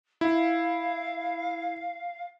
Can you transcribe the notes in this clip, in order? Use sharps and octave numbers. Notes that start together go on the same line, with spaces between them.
E4 F5